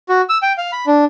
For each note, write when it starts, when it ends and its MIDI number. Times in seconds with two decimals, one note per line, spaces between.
0.09 0.21 66
0.29 0.38 88
0.42 0.53 79
0.58 0.71 77
0.72 0.86 83
0.87 1.05 62